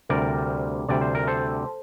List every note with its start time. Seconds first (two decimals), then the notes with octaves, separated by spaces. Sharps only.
0.09 D2 C3 G3 A#4 D5
0.89 D2 C3 G3 D5
1.01 C5
1.15 A#4
1.27 A4 C5